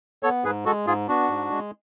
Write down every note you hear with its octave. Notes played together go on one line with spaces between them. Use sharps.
B3 A4 C#5
G#2 G#4 B4
G#3 F#4 A4
G#2 F4 G#4
B3 D4 F#4
G#2
G#3